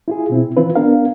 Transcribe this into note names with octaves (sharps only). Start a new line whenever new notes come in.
E4 F4 G#4
B2 C4 E4
E3 C4 E4 F4 B4
B3 D4 A#4 F5